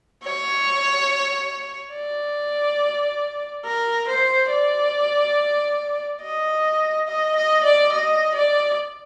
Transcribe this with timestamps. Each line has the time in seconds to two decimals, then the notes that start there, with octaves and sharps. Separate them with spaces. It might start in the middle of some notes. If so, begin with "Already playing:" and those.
0.23 C#5
1.94 D5
3.65 A#4
4.08 C5
4.51 D5
6.22 D#5
7.07 D#5
7.36 D#5
7.64 D5
7.93 D#5
8.35 D5